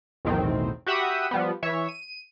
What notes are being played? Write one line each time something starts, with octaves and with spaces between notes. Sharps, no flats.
B1 E2 A2 D#3 C4
F#4 G4 E5 F#5 B5 D#6
F3 G3 B3
E3 C#5 E5
D#7